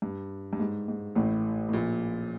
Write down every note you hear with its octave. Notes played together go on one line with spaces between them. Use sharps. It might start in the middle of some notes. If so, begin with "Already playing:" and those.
G2
G2
G#2
G#2
A1 A2
A2
A#1 A#2